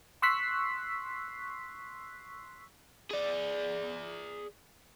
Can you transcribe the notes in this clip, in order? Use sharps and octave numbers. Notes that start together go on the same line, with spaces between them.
C6 C#6 E6 F#6 B6 C7
G#4 D5